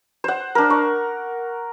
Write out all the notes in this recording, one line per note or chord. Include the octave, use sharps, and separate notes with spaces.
C5 F#5
D4 A#4
C#6